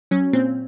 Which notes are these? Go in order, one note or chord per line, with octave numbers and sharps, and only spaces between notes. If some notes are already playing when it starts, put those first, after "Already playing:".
F#3 C#4
A#2 C4